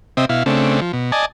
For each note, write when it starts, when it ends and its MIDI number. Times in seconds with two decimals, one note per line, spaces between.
0.17 0.25 48
0.17 0.25 60
0.17 0.25 75
0.17 0.25 76
0.29 0.43 47
0.29 0.43 64
0.29 0.43 77
0.46 0.80 49
0.46 0.80 57
0.46 0.80 60
0.46 0.80 62
0.82 0.92 53
0.93 1.11 47
1.12 1.26 74
1.12 1.26 75
1.12 1.26 80
1.12 1.26 81